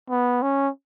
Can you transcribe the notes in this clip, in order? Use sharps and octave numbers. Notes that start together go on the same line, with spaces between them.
B3
C#4